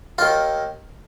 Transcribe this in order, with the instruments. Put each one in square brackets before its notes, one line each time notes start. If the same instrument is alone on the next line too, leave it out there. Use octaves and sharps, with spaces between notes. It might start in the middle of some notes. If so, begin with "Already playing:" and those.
[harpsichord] D#2 D#3 F4